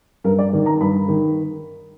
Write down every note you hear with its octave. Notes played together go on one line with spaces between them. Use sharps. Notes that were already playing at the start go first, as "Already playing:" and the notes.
G2 A#4
D5
D#3
A#5
G2 B5
D#3